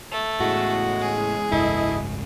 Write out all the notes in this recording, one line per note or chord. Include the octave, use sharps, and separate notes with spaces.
A3
E2 A2 C#3 G#3 F#4
G#4
F#1 C#2 G#2 E3 E4 A4 D#5